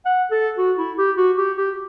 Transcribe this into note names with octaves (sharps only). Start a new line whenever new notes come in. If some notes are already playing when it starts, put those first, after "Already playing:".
F#5
A4
F#4
E4
G4
F#4
G4
G4